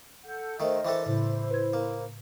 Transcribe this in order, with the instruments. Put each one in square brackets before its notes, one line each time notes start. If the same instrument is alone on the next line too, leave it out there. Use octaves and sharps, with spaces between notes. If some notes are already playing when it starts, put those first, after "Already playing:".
[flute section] A4 F#5 G6
[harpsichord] D#3 A3 [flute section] A#4 C5 D#5
[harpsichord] E3 D4 A4 [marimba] E5 G5 C#6
[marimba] A2 C#3 [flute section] E4 C5
[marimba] B4 G#6
[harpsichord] A#3